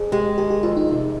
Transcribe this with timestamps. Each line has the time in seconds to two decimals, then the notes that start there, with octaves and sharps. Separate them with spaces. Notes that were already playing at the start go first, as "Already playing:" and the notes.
Already playing: F2 G#4
0.12 G#3 G4
0.38 D#3 G4
0.50 G4
0.63 F2 F4
0.77 D#4
0.89 C3